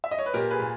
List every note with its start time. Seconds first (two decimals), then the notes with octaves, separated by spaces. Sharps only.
0.04 E5
0.11 D#5
0.19 C#5
0.26 B4
0.34 A#2 G4 A#4
0.51 G#4 B4
0.60 A#2